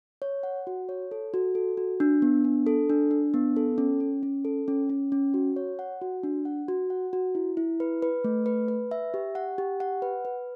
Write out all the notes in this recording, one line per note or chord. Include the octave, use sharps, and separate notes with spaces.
C#5
F#5
F#4
C#5
A4
F#4
A4
F#4
D4
B3
D4
A4
D4
D4
B3
A4
C#4
C#4
C#4
A4
C#4
C#4
C#4
F#4
C#5
F#5
F#4
D4
F#5
F#4
F#5
F#4
E4
E4
B4
B4
A3
B4
B4
E5
G4
F#5
G4
F#5
B4
B4